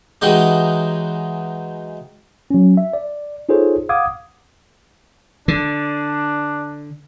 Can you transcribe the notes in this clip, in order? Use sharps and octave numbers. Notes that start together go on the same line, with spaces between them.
E3 F#3 G#3 D#4 G4
F#3 C#4
E5
D5
D#4 F4 G#4 A4 C5 C#5
F5 F#5 D6 D#6 G#6
D3 D4